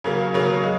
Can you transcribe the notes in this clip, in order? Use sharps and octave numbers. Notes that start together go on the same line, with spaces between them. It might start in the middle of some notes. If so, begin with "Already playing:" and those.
C#3 F#3 A#3
C#3 F#3 A#3
G#3